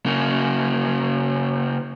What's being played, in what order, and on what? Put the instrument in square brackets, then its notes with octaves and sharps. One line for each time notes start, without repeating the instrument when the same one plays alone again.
[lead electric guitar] C#3 A#3